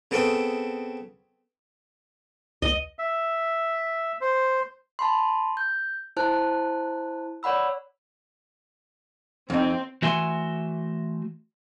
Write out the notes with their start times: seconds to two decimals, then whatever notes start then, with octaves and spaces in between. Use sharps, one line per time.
0.11 C#3 B3 C4 A4 C#6 D#6
2.62 C#2 D#5
2.99 E5
4.21 C5
4.99 A5 B5 C6
5.57 G6
6.17 E4 C5 A5 F#6
7.43 C#5 D5 F#5 B5 E6
9.50 F2 C4 D#4
10.02 E3 A3 F#4 E5 G#5 C6